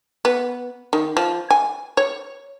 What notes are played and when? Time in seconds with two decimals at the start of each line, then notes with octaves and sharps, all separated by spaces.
0.25 B3
0.93 D#3
1.17 F3
1.51 G#5
1.97 C#5